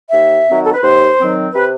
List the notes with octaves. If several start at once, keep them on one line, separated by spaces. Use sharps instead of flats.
D#2 E5
D#3 F#3 C4
A4
B4
D#2 C5
D#3 F#3 C4
C3 B4